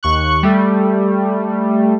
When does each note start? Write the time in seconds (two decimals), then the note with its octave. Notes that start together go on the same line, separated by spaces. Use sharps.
0.03 D#2 C#6 F#6
0.43 G3 A3